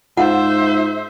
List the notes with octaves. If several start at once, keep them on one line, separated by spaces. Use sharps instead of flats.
G#2 F4 C5 E5 F#5